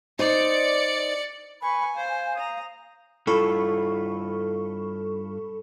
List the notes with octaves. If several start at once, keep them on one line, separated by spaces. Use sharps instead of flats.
D#4 C5 D5 C#7
B4 G#5 B5 C#6
C5 F5
A#5 D#6
G2 E4 F4 A4 B5 C#6